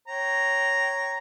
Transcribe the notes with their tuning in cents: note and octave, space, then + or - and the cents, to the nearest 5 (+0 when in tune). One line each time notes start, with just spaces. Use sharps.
C#5 +0 G5 -25 A#5 +0